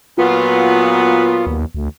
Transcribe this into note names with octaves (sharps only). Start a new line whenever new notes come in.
A#2 F#3 B3 F4
D#2
D2